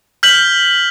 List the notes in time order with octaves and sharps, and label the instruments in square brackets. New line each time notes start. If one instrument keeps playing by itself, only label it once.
[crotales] F6 G6 B6 F#7